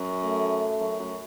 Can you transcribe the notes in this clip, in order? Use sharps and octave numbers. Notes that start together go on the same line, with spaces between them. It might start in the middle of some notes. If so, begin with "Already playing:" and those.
Already playing: F#2
A3
F#2
F#2